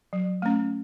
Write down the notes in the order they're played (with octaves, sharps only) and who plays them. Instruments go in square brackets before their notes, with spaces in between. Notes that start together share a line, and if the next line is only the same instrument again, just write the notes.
[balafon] F#3
A3 C#4